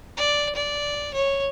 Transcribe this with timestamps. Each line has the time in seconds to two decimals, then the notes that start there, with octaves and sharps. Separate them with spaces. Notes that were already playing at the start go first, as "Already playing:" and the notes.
0.17 D5
0.56 D5
1.14 C#5